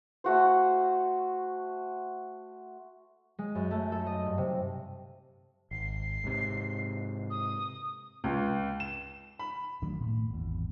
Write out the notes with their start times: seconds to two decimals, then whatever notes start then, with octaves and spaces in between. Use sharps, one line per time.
0.24 A3 F#4 C5
3.39 G#3
3.55 F#2
3.71 A3
3.92 A4
4.06 D#5
4.25 G2
4.38 C3
5.71 G#1 C7
6.24 G#2 C3
7.30 D#6
8.24 C#2
8.80 E7
9.39 B5
9.82 D#3 F#3 A3 D4
10.00 A2
10.30 G#1 E2